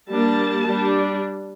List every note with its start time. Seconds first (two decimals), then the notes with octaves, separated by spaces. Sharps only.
0.12 G3 A#3 D4 A5
0.66 G3 D4